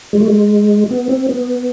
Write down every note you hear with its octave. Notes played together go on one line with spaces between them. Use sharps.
G#3
A3
G#3
B3
C4
B3